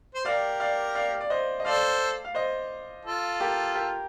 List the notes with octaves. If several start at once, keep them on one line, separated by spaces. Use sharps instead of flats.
C5
G4 A#4 D5 F5
D5 F5
D5 F5
D5
C5 D#5
D#5
A4 C5 D5 F5
F5
C5 D#5
F4 A4
G4 A#4
G4 A#4